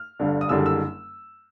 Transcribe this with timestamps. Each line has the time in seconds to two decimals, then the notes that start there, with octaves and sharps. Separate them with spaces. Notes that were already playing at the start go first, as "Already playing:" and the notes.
Already playing: F6
0.20 G1 G2 D3
0.41 D#6
0.49 F#1 F#2 D3 G3 E6
0.66 E6